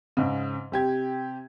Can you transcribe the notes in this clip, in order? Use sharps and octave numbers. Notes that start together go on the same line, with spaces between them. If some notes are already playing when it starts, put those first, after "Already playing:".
G#2 C#3
C3 G4 G#6